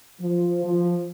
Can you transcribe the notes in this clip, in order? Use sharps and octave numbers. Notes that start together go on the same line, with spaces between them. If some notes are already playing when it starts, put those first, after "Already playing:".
F3
F3